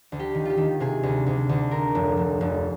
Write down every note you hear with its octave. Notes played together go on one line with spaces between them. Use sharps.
D2
G4
D#3
F4 G4
D#3
C3 G#4
D2
D2
D2
D3 A#4
F1
F1
F1